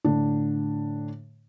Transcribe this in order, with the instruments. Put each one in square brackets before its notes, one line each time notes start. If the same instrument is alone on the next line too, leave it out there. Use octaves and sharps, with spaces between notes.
[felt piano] A2 D3 D4